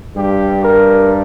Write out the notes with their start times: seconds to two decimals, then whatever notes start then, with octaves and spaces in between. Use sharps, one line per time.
0.16 G2 G3 G4
0.62 A#4